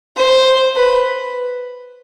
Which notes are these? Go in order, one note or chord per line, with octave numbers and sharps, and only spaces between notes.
C5
B4